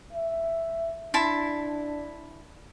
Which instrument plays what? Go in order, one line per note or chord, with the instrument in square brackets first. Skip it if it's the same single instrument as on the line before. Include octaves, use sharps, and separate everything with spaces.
[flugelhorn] E5
[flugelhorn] D4 [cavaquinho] E4 A5 C6